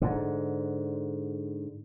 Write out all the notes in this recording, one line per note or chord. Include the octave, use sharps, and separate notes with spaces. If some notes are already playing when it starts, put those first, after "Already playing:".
G#2 D3